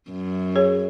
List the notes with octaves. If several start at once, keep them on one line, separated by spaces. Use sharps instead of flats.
F#2
G#4 C#5